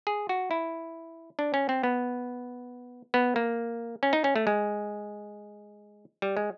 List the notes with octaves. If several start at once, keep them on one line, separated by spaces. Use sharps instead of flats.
G#4
F#4
E4
D4
C#4
C4
B3
B3
A#3
C#4
D#4
C#4
A3
G#3
G3
G#3